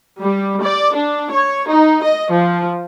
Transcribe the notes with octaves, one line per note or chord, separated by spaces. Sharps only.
G3
D5
D4
C#5
D#4
D#5
F3